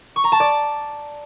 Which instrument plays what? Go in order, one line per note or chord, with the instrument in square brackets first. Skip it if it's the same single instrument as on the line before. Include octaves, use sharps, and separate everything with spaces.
[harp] C#6
A#5
A5
D5